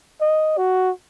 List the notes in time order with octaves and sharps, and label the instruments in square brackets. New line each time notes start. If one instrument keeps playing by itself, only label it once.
[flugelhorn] D#5
F#4